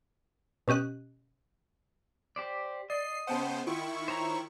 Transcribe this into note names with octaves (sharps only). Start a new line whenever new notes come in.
B2 C#4 G4 D#5 F#6
G4 C5 D5
D5 D#5 C7
C#3 B3 C5 F#5 G5 A5
D#3 E4 F4 G5 C#6
C5 C#5 A#5